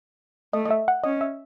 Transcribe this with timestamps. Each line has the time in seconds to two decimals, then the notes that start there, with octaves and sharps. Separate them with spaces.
0.53 A3 D#5
0.65 D#5
0.71 E5
0.88 F#5
1.04 C#4 D#5
1.21 E5